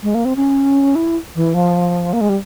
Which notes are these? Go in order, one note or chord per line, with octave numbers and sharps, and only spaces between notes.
G#3
A#3
C4
C#4
E4
E3
F3
A#3
G#3
G3